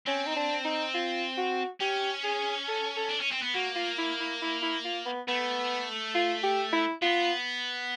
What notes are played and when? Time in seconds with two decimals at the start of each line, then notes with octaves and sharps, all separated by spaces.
0.06 C4 C#4
0.27 D#4
0.36 D4
0.65 D#4
0.94 F4
1.37 F#4
1.81 C#4 G4
2.24 G#4
2.68 A4
2.96 A4
3.10 D4
3.21 C#4
3.32 C4
3.43 B3
3.54 A#3 F#4
3.76 F4
3.98 E4
4.20 E4
4.42 E4
4.62 E4
4.85 F4
5.06 B3
5.28 A3 B3
6.14 F4
6.43 G4
6.72 E4
7.02 B3 F4